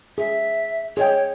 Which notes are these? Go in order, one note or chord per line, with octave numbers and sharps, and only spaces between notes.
G#4 E5
G#4 C#5 D#5 G5